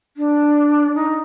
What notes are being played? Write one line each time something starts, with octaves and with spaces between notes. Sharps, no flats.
D4
D#4